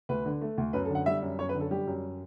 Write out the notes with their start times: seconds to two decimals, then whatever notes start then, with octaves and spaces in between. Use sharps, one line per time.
0.09 D2 B4
0.25 D3
0.41 A3
0.58 D2
0.73 F#2 B4
0.85 A4
0.90 D3
0.95 F#5
1.06 G3 E5
1.22 F#2
1.39 F#2 C#5
1.49 B4
1.55 D3
1.60 A4
1.71 G3 G4
1.87 F#2